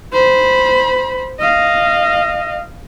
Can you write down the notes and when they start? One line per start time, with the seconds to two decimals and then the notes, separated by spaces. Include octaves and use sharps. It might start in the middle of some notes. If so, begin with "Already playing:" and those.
0.13 C5 B5
1.40 D#5 F5